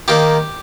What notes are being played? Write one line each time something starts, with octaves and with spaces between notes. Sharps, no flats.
D#3 A#3 G4